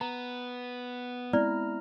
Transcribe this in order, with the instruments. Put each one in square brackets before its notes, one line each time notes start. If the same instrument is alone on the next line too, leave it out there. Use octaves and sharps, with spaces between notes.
[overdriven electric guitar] B3 [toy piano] A#5
[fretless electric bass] G#3 B3 C4 [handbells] E4 A#5 F6 [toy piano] D5